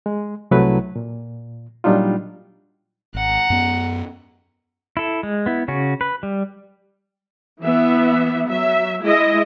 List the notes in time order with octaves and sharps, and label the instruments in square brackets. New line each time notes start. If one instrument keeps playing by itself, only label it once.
[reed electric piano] G#3
C2 C3 F#3 A3 E4 B4
A#2
A#2 F#3 G3 D4 D#4 F4
[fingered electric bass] G#1 [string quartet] F#5 A#5
[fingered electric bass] F#2 B3
[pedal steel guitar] E4 A4
G#3
B3 E4
C#3 C#4 F#4
B4
G3
[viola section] E3 B3 E5
F#3 E5
G#3 E4 D#5 E5